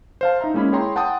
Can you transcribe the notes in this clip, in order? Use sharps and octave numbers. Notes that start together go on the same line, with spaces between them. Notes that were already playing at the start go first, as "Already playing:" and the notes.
C5 F5 A5
D#4 E5 A#5
G#3 A#3 C#4 E4 B5
E4 G#4 C#5 G5 A#5 C6
F#5 G5 A5 C6 D#6